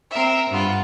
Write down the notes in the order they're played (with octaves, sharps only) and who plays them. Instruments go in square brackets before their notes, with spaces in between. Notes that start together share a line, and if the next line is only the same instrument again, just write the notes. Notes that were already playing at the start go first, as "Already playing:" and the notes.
[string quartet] C4 A#4 E5
G2 B3 F4